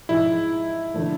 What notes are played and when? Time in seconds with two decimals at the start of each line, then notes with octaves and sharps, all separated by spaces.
0.09 G#2 F3 G#3 E4
0.94 D3 F3 A3